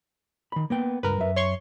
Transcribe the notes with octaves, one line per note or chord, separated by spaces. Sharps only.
D#3 B5
A#3 B3 G5
C#2 G2 A#4 B4
F#2 E5
C#5 C6 C#6